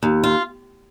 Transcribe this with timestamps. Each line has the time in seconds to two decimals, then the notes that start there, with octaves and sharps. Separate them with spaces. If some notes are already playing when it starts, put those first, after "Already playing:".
0.03 D#2
0.24 F4